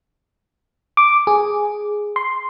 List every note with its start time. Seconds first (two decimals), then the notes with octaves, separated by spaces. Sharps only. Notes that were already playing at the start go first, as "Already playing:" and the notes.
0.97 D6
1.27 G#4
2.16 C6